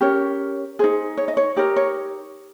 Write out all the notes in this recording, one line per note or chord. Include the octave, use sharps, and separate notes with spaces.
C#4 G4 A#4 C#5
D#4 G#4 C5
C#5
D#5
C#5
D#4 G4 A#4 C#5
C#5